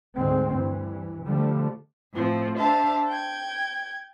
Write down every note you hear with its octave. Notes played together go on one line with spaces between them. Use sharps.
D2 G#2 G#3 C4
G2 E3
D3 F3 G3 A3
A2 F3 C4
D4 C5 E5 F5 A5
G5 G#6